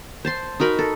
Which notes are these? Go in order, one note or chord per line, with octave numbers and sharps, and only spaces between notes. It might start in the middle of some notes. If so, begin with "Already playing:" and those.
C5 A5 C6
D#4 F#4 A#4 B5
A4